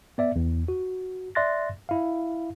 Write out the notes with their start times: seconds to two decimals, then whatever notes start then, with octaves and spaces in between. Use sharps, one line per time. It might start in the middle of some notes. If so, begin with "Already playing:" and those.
0.18 B3 D5 E5
0.36 E2
0.68 F#4
1.35 D5 E5 C6 F#6 A6 A#6
1.89 E4 F5